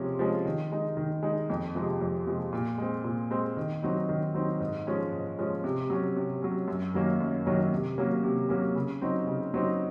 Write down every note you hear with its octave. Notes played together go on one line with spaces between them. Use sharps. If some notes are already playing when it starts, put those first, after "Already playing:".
Already playing: C3 F3 G#3 C#4
F3 G#3 C#4
D#3
G#3 D#4
D#3
G#3 D#4
F2
C3 F3 G#3
F2
C3 F3 G#3
A#2
G#3 C4
A#2
G#3 C4
D#3
F#3 C4 D#4
D#3
F#3 C4 D#4
G#2
F3 G#3 C#4
G#2
F3 G#3 C#4
C3
F#3 C#4
C3
F#3 C#4
F#2
D#3 F#3 A#3 C#4
F#2
D#3 F#3 A#3 C#4
C3
F#3 A#3 C#4
C3
F#3 A#3 C#4
C#3
F#3 C4 D#4
C#3
F#3 C4 D#4